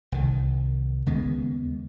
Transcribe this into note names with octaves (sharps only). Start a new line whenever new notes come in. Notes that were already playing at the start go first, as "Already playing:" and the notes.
C2 D#3
D#2 C#3 G#3 B3